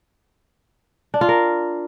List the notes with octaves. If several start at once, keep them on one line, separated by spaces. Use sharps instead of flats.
D4
F4
A#4